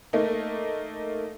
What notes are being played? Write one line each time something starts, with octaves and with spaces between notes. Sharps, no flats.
A3 A#3 D#4